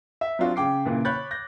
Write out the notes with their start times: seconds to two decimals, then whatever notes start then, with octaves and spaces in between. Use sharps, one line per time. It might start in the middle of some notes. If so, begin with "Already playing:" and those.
0.21 E5
0.39 F#3 C4 D4 F4 F#4
0.56 C#3 G5 D6 C7
0.85 A#2 C#3 E3
1.05 C#5 B5 F#6 G6 A6
1.31 G6 A#6